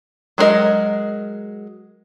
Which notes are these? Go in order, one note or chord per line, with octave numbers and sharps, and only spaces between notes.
F#3 G#3 D#4 A#4 D#5